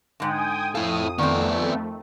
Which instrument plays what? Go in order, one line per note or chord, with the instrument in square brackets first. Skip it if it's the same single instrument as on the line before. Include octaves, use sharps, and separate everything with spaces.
[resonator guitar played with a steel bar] G#2 D3 [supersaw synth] G5 G#5 D#6
[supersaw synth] F2 D#6 [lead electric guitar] E4 A4 [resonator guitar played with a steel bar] F5
[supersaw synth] F2 A3 [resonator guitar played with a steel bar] D#3 C4 [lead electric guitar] B3 D5